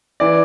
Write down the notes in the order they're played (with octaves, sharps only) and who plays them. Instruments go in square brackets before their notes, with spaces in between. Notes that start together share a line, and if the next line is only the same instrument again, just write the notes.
[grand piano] E3 D5